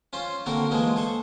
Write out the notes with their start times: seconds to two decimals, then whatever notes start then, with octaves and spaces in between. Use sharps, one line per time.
0.13 C#4 F4 C5
0.46 D3 A#3 C4 F#4 A#4
0.71 E3 F3 G#3 A#3
0.96 A4 C5 C#6